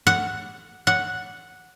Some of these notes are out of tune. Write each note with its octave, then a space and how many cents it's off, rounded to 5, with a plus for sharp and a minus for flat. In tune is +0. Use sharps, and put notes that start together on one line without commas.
F#5 +0
F#5 -5